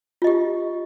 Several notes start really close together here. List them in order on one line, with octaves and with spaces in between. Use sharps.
F4 D#5 G4